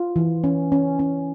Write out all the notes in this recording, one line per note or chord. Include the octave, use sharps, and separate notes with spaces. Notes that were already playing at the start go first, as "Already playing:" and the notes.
Already playing: F4
E3
C#4
C#4
C#4